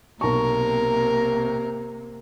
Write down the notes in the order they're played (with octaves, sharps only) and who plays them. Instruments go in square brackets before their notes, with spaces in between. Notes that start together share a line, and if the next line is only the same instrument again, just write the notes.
[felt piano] B1 A5 C#6 [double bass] C3 A#3 [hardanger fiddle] A#4